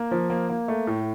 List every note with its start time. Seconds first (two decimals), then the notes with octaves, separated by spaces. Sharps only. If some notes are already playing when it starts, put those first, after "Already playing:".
Already playing: A#3
0.11 F3
0.30 A#3
0.50 A#3
0.68 A3
0.87 A2